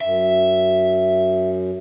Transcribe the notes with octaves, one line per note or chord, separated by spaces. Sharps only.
F#2 E5